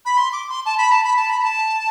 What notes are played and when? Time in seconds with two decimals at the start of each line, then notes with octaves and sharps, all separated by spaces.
0.05 B5
0.17 C6
0.33 D6
0.49 C6
0.66 A5
0.78 B5
0.92 A5
1.04 B5
1.17 A5
1.30 B5
1.42 A5